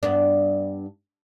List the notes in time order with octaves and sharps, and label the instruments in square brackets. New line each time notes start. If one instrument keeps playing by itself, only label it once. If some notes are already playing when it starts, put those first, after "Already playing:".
[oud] G2 B3 D4